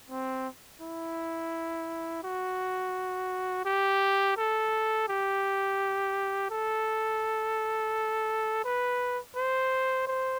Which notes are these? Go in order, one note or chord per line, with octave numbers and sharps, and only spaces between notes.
C4
E4
F#4
G4
A4
G4
A4
B4
C5
C5